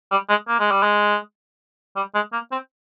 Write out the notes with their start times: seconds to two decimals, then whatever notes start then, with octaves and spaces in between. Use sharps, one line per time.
0.11 G3
0.29 G#3
0.48 A#3
0.60 G#3
0.71 G3
0.83 G#3
1.96 G3
2.15 G#3
2.33 A#3
2.52 C4